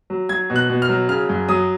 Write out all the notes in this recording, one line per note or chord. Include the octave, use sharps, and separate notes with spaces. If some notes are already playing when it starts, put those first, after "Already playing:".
F#3
F#3 G#6
B2
F#6
B2
F6
F#3
C#3 F6
F#2
F#3 D#6